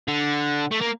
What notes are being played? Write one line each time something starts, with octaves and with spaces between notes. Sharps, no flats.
D3
A3
A#3